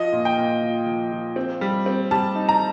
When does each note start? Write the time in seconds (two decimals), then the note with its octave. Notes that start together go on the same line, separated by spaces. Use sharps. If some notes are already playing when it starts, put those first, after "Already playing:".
Already playing: F3 D#5
0.13 A#2
0.25 G5
0.37 A#2
0.62 F3
0.87 F3
1.12 F3
1.36 C4
1.61 G3
1.86 C4
2.11 G3 A5
2.35 D#4
2.49 A#5